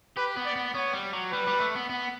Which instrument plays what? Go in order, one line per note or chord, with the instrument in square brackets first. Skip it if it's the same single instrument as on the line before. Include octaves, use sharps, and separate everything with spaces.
[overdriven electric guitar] G4 [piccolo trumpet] B4
[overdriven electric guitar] B3
[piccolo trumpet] D5
[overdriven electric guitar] B3
[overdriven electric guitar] B3 [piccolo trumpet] C#5
[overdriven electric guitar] G3
F#3
[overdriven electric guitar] G3 [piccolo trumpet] B4
[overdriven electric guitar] G3
A3
B3
B3